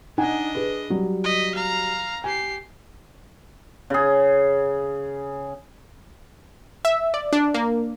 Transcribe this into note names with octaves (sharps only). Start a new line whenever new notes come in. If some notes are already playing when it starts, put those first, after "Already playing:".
D4 D#4 D#5 F#5 G#5
G#4 B4
F#3 G3
D#5 B6
F5 A#5
G4 G#5 C7
C#3 G#4
E5
D5
D4
A#3